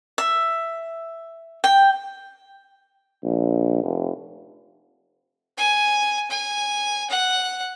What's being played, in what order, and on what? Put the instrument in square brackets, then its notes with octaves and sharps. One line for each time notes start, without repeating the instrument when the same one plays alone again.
[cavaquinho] E5
G5
[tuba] A#1
F1
[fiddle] G#5
G#5
F#5